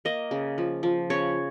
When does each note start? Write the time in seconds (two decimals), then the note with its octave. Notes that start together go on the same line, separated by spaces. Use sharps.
0.05 A#3 D#5
0.31 C#3
0.58 F3
0.83 F3
1.10 C#3 C#5